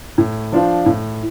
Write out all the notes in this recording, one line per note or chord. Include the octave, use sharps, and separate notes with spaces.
A2
F3 D4 F4 C5
A2